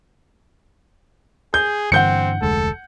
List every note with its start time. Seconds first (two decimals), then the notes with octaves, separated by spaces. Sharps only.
1.54 G#4 G6
1.92 G2 D3 E3 C4 F#5 G6 C#7
2.42 F1 D2 G#3 A4